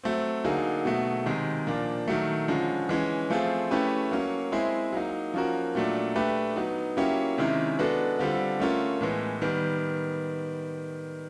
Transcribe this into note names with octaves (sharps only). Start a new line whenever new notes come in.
F#3 A3 C4
D3 F#3 A#3 D#4 G#4
B2 F#3 A3
C3 D#3 G#3
A#2 F3 A#3 D4
D#3 F#3 A3
D3 F3 G#3 C#4
E3 G#3 C#4
F3 A3 C4 F4 G#4
A3 C#4 E4 G4 B4
F#3 A#3 C#4
G#3 C4 E4 G#4
F#3 A#3 D#4
F3 A#3 C#4 F#4 A#4
A#2 F#3 A3 D4
A3 D4 G4 B4
F#3 B3 D#4
F#3 A#3 C#4 E4 G4
C3 D#3 G#3 C#4 E4
G#3 B3 D4 F#4 A4
D3 G3 C4 F4 A4
A3 C#4 F4 A#4
A2 E3 G#3 B3
D#3 G3 B3